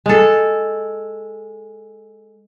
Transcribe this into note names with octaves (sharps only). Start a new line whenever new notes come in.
G#3 A4